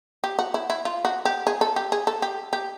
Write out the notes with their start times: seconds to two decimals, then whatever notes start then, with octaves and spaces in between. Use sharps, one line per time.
0.24 G4
0.39 F#4
0.54 E4
0.70 E4
0.85 F4
1.05 F#4
1.25 G4
1.47 G#4
1.61 A4
1.76 G4
1.92 G#4
2.07 A4
2.22 G4
2.53 G4